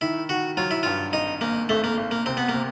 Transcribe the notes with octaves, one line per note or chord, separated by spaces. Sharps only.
D#3 E4
D#3 F#4
F#3 F4
E4
G2 F4
G#1 D#4
G#1 A#3
G#1 A3
A#3
G#1
A#3
C3 C4
B3
A#3
C3